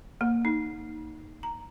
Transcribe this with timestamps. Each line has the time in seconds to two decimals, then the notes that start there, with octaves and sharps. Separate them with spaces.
0.21 A#3
0.45 D#4
1.43 A#5